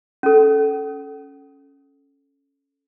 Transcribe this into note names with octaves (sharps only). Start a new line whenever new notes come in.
C#4 A4